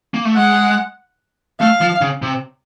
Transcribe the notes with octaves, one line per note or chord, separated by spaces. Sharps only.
A#3
A3
G#3 F#5
A3 F5
F3
C#3
C3